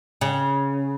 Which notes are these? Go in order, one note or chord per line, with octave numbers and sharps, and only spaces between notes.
C#3